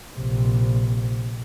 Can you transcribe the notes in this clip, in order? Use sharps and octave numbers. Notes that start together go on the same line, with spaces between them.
A#1 C3